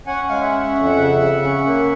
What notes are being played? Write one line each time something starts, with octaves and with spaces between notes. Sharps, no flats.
C#4 F#5 G#5
G#3 F5
E5 F#5
C#4
F2
C#3
C#3
C#4
A#3